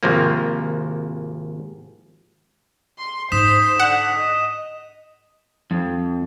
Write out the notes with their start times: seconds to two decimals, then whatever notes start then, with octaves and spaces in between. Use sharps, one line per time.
0.03 G#1 C3 F3 A#3
2.99 C6
3.32 G#2 D#4 C5 D#6 B6 E7
3.80 D3 F#5
4.17 D#5
5.71 F2